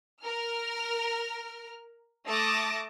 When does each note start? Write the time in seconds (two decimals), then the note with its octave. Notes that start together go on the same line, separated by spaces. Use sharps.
0.22 A#4 F6
2.26 A3 A5 D6 D#6 A#6